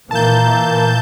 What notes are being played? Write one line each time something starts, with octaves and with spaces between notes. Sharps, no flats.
A#2 E3 A#3 A5 G6